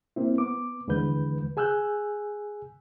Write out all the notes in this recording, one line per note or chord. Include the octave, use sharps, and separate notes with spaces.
A#3 C4 E4
B3 D6
D#2 D3 E3 G#3 B4 G6
G#4 G#5 E6 F#6 G6